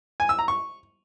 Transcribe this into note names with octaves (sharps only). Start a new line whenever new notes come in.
G#5
E6
A#5
C#6